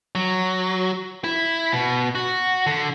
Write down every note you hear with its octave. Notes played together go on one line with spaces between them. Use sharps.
F#3
E4
B2
F#4
D3